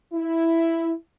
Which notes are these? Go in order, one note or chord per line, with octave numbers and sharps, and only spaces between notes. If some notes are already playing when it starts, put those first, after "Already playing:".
E4